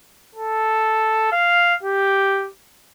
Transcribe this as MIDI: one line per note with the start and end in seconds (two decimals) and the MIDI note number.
0.35 1.28 69
1.32 1.75 77
1.83 2.49 67